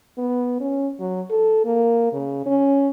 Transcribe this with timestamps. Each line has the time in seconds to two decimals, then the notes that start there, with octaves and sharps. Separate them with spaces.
0.18 B3
0.60 C#4
1.00 F#3
1.30 A4
1.65 A#3
2.13 C#3
2.46 C#4